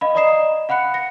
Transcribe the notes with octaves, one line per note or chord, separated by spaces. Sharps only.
D#5 F5 B5
D5 D#5 A#5 D#6 C7 E7
F5 F#5 B5 F#6 C#7
A#6 C#7